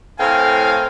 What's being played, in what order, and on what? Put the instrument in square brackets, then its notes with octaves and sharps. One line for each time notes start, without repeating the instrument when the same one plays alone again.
[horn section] A2 F5 G#5 [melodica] C4 A#4 G5